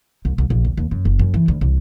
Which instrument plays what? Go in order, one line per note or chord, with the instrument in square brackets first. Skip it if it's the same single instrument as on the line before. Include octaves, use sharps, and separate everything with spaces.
[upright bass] C2
C2
A#1
D2
D#2
F#2
F#1
F#2
E3
D2
C2